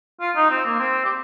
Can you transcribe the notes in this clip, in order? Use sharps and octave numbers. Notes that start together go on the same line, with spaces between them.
F4
D#4
C4
A#3
C4
G4